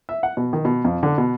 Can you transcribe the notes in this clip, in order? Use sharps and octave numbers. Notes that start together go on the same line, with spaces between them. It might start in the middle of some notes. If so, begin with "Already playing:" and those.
E5
F#5
B2
D#3
B2
F2
D3
B2